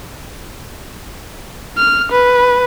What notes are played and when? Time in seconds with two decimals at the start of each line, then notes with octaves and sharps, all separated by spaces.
1.77 F6
2.12 B4